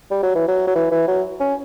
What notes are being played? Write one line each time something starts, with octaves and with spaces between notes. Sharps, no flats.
G3
F#3
E3
F#3
F#3
E3
E3
F#3
C#4